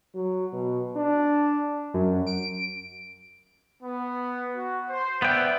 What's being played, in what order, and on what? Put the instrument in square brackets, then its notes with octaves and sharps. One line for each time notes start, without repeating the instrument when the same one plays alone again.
[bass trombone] F#3
B2
D4
[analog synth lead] F#2
D7
[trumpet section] B3
F#4
C5
[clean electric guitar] B3 G5 [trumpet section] B4 D5 E5